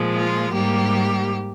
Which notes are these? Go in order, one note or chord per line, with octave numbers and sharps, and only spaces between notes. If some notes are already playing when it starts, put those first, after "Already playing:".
Already playing: A#2 F3 G#3
F4
G#2 G3 A#3 G4